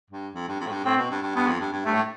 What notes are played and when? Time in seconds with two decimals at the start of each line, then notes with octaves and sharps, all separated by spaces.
0.10 G2
0.35 F2
0.48 G2
0.60 F2
0.67 A2
0.72 G2
0.84 A2 C4
0.97 B2
1.10 G2
1.23 G2
1.35 G2 B3
1.47 F2
1.61 G2
1.72 G2
1.85 G2 A3
1.93 A2